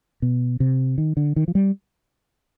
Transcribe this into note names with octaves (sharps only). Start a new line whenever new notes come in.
B2
C3
D#3
D3
D#3
F3
G3